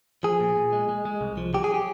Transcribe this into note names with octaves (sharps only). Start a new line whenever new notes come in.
F3 G#4
A#2
A#2
G#3
G#3
G#3
C2
F3
F#3 G4
G#4
F#3 G4